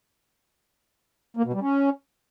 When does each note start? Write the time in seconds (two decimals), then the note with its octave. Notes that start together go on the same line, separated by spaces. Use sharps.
1.37 A#3
1.45 B2
1.53 G3
1.62 C#4